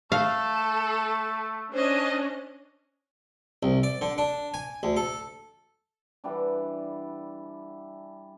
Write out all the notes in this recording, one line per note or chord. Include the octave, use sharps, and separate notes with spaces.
A3 A4 F5
C#4 D4 C5 D#5
C2
D5
D3
D4
G#5
D2
A4
D3 E3 G3 D4